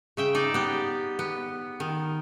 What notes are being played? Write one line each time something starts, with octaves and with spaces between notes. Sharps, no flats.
C#3 E5 G5
D#4 D5
B3 G4
B3
D#3